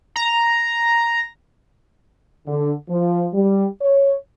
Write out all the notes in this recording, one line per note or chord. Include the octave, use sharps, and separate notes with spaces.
A#5
D3
F3
G3
C#5